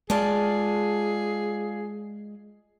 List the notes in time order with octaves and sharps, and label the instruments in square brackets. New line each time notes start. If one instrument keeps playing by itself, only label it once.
[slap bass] G#3 [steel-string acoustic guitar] F4 D5 A5 [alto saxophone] G#4